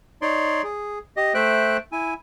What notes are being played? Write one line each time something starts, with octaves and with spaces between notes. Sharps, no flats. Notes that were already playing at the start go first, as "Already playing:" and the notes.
D#4 C#5 D5 C6
G#4
G4 D#5
A3 C5 E5 G5 F#6
E4 G#5